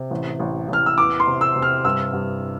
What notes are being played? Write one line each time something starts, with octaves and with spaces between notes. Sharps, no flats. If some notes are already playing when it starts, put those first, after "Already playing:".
Already playing: C3
A1
A1
A1 F6
E6
E2 D6
C6
C3
E6
C3
F6
G2 E6
G2